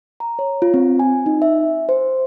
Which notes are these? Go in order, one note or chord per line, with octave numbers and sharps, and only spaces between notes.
A#5
C#5
F4
C4
G#5
D#4
E5
C5